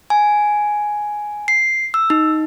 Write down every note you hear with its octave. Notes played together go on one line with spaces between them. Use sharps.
G#5
C7
E6
D#4